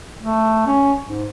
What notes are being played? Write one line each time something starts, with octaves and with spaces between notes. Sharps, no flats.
A3
C#4
G#2